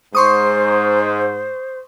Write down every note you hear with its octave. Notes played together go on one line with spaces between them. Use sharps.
G#2 C5 C6 C#6 D#6